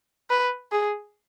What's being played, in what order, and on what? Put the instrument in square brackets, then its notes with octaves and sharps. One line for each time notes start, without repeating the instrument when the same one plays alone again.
[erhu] B4
G#4